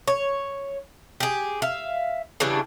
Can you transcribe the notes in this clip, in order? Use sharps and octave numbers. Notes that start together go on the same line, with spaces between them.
C#5
G4 G#4
E5 F5
C#3 E3 G3 D4